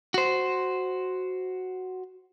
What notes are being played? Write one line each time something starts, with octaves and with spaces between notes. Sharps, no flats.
F#4 C5